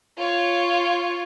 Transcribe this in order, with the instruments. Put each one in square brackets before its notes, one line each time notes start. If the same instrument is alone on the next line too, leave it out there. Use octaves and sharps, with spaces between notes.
[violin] F4 C#5